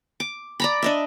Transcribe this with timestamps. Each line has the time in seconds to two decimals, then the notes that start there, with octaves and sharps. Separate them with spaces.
0.20 D6
0.60 D5 A#5 B5
0.82 D4 D#5 E5